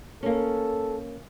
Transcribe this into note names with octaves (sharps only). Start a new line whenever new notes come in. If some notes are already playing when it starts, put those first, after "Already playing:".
A#3 C#4 A4